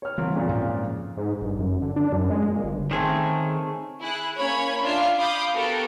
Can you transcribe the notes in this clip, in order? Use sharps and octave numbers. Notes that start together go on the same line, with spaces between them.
C#5 F6
C2 E3
F2 A#2 C#3
G#2 C4
G#2
G1
F#2
D3
D4
F#2
G#3
A#2
G1
D#3 A3 C4 C#4 G#4
E4 G#4 F#6
A#3 C#4 C#5 B5 G#6
D4 F4 E5 C7
F5 B5 D6 D#6 G6
B3 F#4 G4 A4 A#4